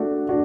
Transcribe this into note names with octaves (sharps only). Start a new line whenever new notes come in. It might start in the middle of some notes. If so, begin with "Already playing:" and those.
Already playing: A3 D4 F#4
D4 F#4